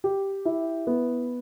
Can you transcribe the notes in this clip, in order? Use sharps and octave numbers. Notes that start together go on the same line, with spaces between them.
G4
E4
B3